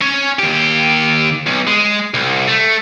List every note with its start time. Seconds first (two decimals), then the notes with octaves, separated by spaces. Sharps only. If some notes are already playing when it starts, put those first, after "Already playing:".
0.02 C#4 C#5
0.39 D#2 G4
1.47 B1
1.67 G#3
2.14 C2
2.48 A3